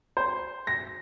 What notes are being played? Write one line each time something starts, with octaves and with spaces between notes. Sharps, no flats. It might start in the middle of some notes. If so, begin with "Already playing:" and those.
C5
A#6